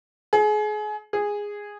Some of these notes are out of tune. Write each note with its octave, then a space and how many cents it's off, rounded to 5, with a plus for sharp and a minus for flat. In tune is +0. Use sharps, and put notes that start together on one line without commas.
G#4 +30
G#4 -10